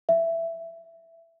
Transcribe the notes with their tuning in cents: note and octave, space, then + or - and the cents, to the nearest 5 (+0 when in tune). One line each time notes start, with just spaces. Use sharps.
E5 +10